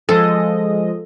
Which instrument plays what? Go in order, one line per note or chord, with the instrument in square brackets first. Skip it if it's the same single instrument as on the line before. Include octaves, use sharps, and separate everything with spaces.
[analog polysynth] F3 G#3 D#5 [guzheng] A4